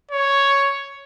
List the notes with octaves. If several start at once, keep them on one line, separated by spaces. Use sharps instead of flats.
C#5